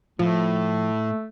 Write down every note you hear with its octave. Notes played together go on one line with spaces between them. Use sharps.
A2 F3 A3